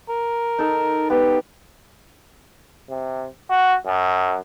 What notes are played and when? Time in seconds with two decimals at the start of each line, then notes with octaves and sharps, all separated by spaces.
0.09 A#4
0.58 D#4 A4
1.10 B3 G4
2.90 C3
3.50 F#4
3.87 F#2